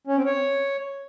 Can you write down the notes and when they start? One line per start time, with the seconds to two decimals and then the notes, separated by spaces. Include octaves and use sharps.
0.07 C#4
0.17 C4
0.26 C#5